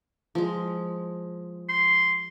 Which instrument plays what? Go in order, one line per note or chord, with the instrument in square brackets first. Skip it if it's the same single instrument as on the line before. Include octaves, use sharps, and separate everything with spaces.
[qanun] F3 G#3
[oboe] C6